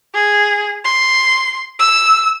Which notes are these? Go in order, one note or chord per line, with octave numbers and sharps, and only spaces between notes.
G#4
C6
E6